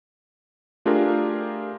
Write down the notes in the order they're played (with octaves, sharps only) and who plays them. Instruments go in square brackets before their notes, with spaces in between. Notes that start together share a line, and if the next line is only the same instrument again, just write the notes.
[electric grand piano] A3 D4 F4 G4 G#4 A#4